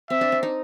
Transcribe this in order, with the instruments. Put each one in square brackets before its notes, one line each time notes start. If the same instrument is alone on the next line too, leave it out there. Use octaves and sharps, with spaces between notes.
[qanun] C4 [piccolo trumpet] E5
[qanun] D4
D4
D#4